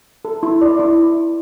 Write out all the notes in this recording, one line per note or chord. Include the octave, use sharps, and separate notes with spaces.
A4
E4
D5
E4